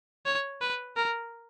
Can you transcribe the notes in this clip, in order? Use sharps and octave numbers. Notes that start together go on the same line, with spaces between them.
C#5
B4
A#4